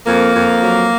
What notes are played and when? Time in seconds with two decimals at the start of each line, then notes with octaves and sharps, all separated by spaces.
0.06 F2 A#3
0.34 F2
0.63 F#3